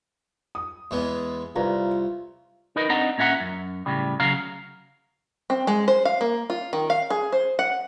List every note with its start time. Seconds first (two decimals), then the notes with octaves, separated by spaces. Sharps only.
0.55 D#6
0.91 E2 G#3 B3
1.56 C2 F4 B4 D5 A#5
2.76 D#4 A#4 B4 D#5
2.89 C4 D4 D#4 D#5 F#5 A#5
3.18 A#2 C#4 E5 F#5 A#5
3.40 F#2
3.86 A2 C#3 G3
4.20 C#3 F#3 F5 A#5
5.50 C4
5.67 G#3
5.88 C5
6.05 F5
6.21 A#3
6.50 F4
6.73 D#3
6.90 F5
7.10 G#4
7.32 C5
7.59 F#5